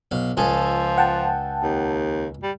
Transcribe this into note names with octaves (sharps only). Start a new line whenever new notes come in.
B1 F5
C#2 F3 G#4 A4
F#5 G5 A5
D#2
G3